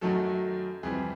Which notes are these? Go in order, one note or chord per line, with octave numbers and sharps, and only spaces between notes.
F#2 D#3 F#3 A3 A4
F2 C3 E3 G3 G#4